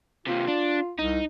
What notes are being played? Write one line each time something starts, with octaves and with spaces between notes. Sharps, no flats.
D#2 C3 F4
D4
C2 D#4